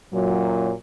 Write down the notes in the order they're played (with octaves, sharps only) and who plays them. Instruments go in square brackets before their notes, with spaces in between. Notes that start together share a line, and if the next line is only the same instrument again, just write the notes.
[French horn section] F#2 A#2 F#3